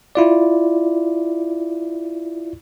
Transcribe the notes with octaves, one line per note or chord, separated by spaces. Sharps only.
E4 F4 D5